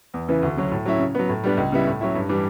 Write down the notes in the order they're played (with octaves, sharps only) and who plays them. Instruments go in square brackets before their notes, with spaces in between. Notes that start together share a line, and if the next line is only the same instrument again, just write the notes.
[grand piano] E2
C#3 E3 B3 E4
D2
C#3 F#3 C#4
A2
F#3 C#4 E4
C#3
F#3 B3
A2
G3 B3 D4
C#2
C#3 G3 B3 E4
A2
F#3 C#4 E4
G2
E3 G3 D4